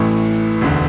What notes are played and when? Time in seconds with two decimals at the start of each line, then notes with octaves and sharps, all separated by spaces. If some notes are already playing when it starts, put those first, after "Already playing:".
Already playing: A1 A2 E3 A3
0.61 E1 D2 D3